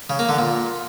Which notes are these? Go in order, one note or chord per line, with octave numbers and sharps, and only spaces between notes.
C#3
A#3
D3
A#2